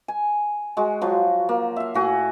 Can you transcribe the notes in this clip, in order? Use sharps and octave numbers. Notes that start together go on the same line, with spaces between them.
G#5
G#3 F#4
F3 F#3
A#3
E5 F5
A2 F#4 G#5